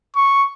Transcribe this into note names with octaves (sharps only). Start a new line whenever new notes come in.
C#6